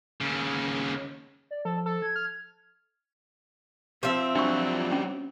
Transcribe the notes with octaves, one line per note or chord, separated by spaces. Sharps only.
D#2 C#3
D5
F3 A4
A4
G#6
F6
F3 C4 E5
F#3 G3 D4 C#6
C#4